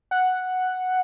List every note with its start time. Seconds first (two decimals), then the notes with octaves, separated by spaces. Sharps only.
0.11 F#5